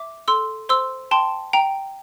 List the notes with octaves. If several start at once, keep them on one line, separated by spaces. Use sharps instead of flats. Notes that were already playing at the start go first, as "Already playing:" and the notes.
Already playing: E5 D6
A4 C6 E6
C5 C6 E6
G5 A5 C6
G5 A#5